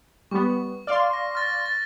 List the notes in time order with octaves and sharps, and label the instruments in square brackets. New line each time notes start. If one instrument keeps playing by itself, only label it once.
[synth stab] G3 B3 [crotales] C#6
[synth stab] D5 F5 C6 [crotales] F6
[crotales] A#6
F6 A6 A#6
A6